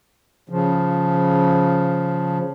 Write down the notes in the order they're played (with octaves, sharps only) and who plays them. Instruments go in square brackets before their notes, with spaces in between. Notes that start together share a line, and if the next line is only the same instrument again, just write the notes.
[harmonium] C#3 F3